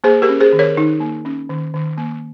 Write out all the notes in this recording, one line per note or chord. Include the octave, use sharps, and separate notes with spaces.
A#3 G#4 C5
G4 A#4
C#4
G#4 C5
D#3
A#4 C#5
D#3 D#4
A#3
C#4
D#3
D#3
A#3